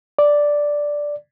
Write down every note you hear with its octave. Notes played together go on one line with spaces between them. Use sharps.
D5